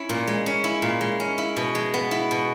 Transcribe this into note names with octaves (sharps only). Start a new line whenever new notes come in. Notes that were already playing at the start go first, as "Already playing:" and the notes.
Already playing: C#4 E4
A#2
G#3
C#4
E4
A#2
G#3
C#4
E4
B2
G#3
B3
E4
B2